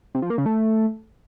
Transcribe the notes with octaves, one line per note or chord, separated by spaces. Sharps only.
C3
F3
A#3
C#3
A3